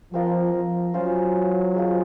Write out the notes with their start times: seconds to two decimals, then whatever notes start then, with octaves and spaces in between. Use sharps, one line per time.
0.13 F3 C4 F4 A#4 D#5
0.53 F3
0.94 F#3 C#4 F4 C5 F5
1.75 G#3 C4 F4